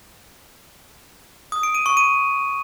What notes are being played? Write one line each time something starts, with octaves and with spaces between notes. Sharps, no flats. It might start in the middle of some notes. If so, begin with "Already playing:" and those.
D#6
D7
D#7
C#6
D#7